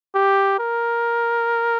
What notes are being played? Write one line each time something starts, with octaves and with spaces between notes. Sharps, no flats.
G4
A#4